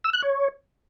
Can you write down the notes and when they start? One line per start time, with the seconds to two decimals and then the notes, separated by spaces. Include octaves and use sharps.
0.04 E6
0.13 F#6
0.22 C#5